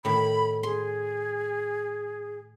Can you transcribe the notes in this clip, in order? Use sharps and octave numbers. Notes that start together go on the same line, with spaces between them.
A2 D#3 B5
G#4 C6